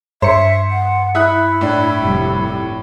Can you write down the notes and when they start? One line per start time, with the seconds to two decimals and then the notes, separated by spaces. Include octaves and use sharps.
0.22 G2 C5 E5 C#7
0.71 F#5
1.15 E4 E5 D#6 F#6
1.61 A2 D4
2.00 F1 G3